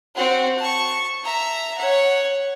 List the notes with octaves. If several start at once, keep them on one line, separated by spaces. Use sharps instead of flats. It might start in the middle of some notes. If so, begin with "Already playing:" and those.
C4 F#4
A5 C#6
E5 A#5
C#5 F#5